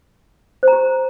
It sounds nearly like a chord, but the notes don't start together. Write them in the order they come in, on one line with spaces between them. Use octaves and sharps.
C5 A#5 G4